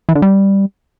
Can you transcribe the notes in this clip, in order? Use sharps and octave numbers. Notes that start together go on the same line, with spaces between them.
E3
D3
G3